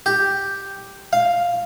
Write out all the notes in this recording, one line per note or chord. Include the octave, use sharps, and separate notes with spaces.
G4
F5